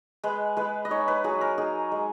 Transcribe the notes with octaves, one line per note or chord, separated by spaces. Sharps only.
G#3 B4
G#3 B4
D#5
D#4 C#5
B4
F#3 G#4
A#4
D#4 G#4
G#3